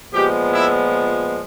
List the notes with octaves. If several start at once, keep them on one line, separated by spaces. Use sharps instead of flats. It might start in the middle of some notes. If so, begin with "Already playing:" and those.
A#2 F3 G#3 B3 G4
E4